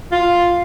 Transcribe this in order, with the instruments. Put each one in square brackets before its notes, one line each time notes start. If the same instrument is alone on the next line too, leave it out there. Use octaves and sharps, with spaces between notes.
[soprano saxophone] F4